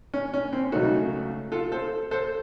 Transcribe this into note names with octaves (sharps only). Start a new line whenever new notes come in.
C#4
C#4
C4
C#2 C#3 F#3 A3 D#4 F#4
F4 A4
A4 C5
A4 C5